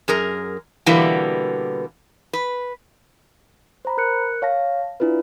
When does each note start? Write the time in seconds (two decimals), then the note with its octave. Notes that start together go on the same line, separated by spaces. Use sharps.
0.08 F#2 G#4 A#4
0.86 B2 D3 E3 G3 A#3 B3
2.33 B4
3.85 C5 A#5 B5
3.97 A#4 F#6 C#7
4.42 C#5 F5 A5 A#6
5.00 D4 E4 F4 B4